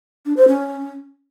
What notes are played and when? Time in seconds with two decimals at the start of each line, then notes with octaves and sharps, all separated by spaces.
0.26 D4
0.37 C5
0.48 C#4